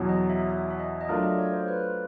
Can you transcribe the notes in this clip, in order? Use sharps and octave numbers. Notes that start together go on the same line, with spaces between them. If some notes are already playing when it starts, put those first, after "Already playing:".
Already playing: E2 B2 F#3
D#5
E5
E5
E5
D#5
D#5
F#3 A3 D4 F4 A#4 E5
D#5
C#5
C5
B4